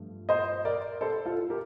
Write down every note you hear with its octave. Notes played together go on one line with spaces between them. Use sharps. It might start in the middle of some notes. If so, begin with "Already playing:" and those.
Already playing: G2 F3 A3
C5 D#5
A#4 D5
A4 C5
F4 A4
G4 A#4